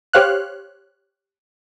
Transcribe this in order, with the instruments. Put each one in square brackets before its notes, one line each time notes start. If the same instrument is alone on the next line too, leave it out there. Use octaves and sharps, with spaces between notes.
[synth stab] G4 C5 C#5 F5 F6 F#6